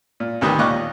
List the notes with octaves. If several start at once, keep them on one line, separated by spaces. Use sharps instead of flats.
A#2
D2 C3 D#3 B4 D#6
D#2 A#2 D#5 C#6 D6 F#6